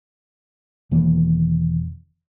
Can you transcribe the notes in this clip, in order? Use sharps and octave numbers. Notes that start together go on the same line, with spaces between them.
E1 D#3 E3 A#3